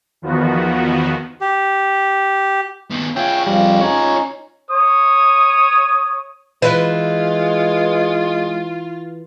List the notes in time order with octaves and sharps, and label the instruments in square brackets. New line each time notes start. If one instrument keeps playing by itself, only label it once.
[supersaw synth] E2 D#3 F3 B3 F#4
[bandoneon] G4
[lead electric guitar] D#3 B3
[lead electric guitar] F4 G#4 [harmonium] C#5 E5 [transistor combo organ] G5
[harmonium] F2 F3 [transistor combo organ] G3
[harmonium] C#4 D#4 [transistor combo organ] C#5
[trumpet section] C#5 D#6
[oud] E3 [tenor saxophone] G#3 [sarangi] F4 [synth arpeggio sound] B4